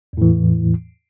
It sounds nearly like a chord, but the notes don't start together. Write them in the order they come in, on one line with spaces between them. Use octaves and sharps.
E2 A2 E3